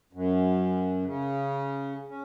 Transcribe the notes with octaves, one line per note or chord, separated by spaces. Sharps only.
F#2
C#3
C#4